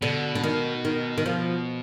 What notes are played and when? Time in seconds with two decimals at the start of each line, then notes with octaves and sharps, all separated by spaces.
0.02 B2 D3
0.35 D3
0.44 D#3
0.85 D#3
1.18 D#3
1.26 F3